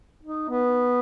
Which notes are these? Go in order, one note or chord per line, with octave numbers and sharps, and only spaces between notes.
D#4
B3